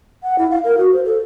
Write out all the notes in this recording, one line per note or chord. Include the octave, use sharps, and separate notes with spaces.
F#5
E4
F5
A#4
F#4
C5
A4